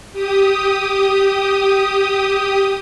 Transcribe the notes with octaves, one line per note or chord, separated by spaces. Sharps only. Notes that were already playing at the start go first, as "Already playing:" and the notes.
G4 D#6